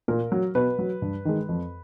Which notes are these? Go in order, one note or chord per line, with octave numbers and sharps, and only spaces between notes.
A#2 A#4
F#3
B2 B4
F#3
G2
D#3 G#3
F2